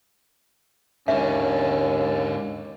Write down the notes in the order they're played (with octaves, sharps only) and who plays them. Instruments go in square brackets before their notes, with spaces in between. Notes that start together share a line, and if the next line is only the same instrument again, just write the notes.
[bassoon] D#2 [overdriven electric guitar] G#2 D3 [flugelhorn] C#4 [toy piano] E5